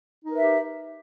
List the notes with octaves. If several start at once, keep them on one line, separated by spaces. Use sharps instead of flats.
D#4 G4 A#4 B4 E5